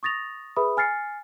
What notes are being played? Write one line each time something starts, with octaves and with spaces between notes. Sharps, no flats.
C#6 D#6 A6 A#6 F7
G#4 B4 E5 B5 D#6
G#5 F6 A6 C7 C#7